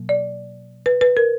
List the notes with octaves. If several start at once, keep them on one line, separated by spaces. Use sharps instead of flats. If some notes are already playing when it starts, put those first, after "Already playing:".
Already playing: B2 F#3 A#3
D5
B4
B4
A#4